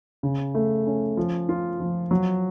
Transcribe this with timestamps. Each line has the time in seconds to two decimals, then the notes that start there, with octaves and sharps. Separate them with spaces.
0.23 C#3
0.55 A3
0.86 C#4
1.17 F3
1.49 F4
1.80 F3
2.11 F#3